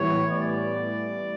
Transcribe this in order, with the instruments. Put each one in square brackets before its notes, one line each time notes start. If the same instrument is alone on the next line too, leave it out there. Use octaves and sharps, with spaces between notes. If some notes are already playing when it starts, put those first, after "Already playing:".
Already playing: [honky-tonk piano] A2 E3 G3 B3 [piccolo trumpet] C#5
[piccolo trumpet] D5